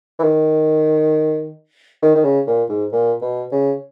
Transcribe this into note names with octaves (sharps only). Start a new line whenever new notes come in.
E3
D#3
D#3
D#3
C#3
A#2
G#2
A#2
B2
C#3